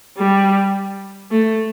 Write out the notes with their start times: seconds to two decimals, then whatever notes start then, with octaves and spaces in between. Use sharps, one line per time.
0.18 G3
1.31 A3